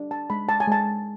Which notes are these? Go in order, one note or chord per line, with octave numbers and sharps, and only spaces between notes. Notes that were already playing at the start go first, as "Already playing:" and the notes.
Already playing: D4
A5
G#3 B5
A5
G#5
G#3 A5